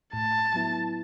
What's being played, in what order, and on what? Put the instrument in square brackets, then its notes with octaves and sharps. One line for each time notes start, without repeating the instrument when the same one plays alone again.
[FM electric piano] A2 [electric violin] A5
[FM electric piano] F#3 B3 E4